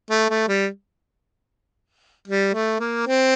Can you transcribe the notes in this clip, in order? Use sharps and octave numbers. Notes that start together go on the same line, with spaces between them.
A3
A3
G3
G3
A3
A#3
C4